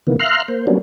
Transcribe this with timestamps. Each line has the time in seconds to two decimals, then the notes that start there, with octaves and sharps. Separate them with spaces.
0.07 C3 D#3 E3 A#3 B3
0.19 E5 F5 A#5 C6 F6 F#6
0.48 A#3 C5
0.67 F#3 G3 A#3 B3 C#4 D4